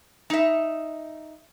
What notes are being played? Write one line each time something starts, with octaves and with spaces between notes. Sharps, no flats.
D#4 E5